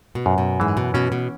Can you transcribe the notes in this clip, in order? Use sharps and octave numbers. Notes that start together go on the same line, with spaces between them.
B2
F#2
B2
G#2 E3
B2
B2 C#4
B2